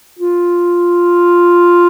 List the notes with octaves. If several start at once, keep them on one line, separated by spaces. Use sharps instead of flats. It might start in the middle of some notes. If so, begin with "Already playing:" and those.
F4